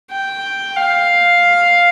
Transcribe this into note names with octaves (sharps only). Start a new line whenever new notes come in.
G5
F5